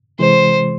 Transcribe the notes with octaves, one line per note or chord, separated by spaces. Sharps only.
C3 E3 G#3 C5